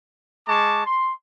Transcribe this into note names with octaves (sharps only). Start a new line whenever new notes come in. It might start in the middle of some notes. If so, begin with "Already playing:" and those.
G#3 A5 C#6 D6
C6